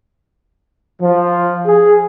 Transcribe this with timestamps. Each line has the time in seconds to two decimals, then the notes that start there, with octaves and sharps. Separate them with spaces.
1.02 F3
1.67 G#4